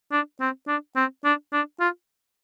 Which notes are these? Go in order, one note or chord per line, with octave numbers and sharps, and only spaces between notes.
D4
C4
D4
C4
D4
D4
F4